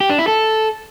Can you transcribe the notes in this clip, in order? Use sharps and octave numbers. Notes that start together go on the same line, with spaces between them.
G4
D4
E4
A4